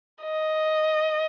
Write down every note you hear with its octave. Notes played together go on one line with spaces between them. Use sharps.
D#5